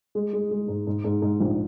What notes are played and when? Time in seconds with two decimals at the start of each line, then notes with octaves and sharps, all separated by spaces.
0.15 G#3
0.33 G#3
0.51 G#3
0.68 G#2
0.87 G#2
1.04 G#2
1.22 G#2
1.40 A#1